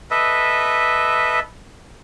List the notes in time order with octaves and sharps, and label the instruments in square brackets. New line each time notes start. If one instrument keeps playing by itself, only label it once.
[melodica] A4 B4 D#5 E5